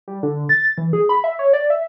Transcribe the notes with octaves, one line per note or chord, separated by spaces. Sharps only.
G3
D3
A6
E3
G#4
B5
E5
C#5
D5
E5